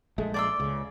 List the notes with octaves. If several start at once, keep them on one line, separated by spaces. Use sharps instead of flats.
A#1 G#3 A3
D5 C6 E6
C#2 C#3